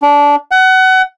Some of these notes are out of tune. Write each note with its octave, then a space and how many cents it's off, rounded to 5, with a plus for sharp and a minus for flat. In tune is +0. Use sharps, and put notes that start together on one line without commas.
D4 -20
F#5 +25